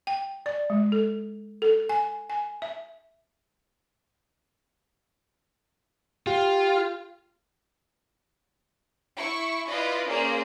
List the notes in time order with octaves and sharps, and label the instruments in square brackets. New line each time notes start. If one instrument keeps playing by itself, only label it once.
[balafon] G5
D5
G#3
A4
A4
G#5
G#5
E5
[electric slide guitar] F4 [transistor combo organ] G4
[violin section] E4 C#6
E4 F4 B4 D5 D#5
A#3 C#4 G#4 C5 D5